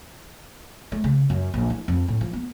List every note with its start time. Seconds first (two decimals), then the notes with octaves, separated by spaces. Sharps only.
0.92 A3
1.04 C#3
1.30 F#2
1.54 A#1
1.70 E4
1.88 F2
2.08 A2
2.21 F3
2.33 B3